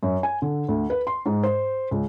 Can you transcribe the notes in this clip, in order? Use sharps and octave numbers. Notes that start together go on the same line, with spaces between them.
F#2
G#5
D3
D2
B4
C6
G#2
C5
C#2